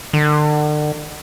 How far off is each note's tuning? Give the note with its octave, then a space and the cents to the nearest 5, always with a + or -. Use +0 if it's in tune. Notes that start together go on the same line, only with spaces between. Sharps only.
D3 +40